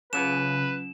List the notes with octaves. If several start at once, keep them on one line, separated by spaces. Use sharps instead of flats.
C#3 F#3 C#4 F4 B4 E7